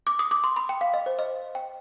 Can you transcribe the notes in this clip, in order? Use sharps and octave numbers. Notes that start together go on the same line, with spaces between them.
D6
D#6
D6
C6
B5
G5
F5
D#5
C5
D#5
G5